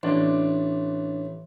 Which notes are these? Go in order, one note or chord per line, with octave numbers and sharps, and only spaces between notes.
A1 D4 D5 C6